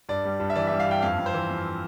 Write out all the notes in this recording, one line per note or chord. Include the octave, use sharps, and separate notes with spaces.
G2 D5
G3
G2
E5
E3 D5
E5
G3
F5
G2 G5
F2 F5
F2
C5
E3
F2